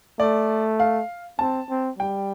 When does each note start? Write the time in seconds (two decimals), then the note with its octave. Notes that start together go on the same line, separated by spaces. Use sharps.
0.19 A3 D5
0.80 F5
1.39 C4 A5
1.69 C4
1.99 G3 G5